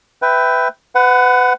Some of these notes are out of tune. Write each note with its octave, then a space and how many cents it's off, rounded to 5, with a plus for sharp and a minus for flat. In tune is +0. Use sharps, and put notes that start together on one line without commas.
B4 +15 E5 +0 G5 +0
B4 +30 F#5 +0